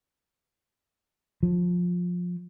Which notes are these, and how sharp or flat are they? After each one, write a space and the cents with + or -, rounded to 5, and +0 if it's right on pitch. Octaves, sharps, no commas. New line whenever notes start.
F3 +20